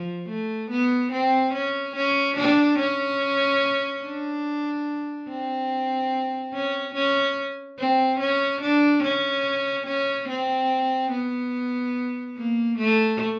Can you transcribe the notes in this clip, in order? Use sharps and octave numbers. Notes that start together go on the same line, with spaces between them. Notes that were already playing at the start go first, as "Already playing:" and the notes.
Already playing: F3
A3
B3
C4
C#4
C#4
D4
C#4
D4
C4
C#4
C#4
C4
C#4
D4
C#4
C#4
C4
B3
A#3
A3